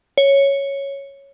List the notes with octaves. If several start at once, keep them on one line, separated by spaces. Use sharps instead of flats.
C#5